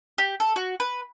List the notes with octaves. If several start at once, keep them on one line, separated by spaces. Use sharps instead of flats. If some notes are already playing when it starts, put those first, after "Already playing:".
G4
A4
F#4
B4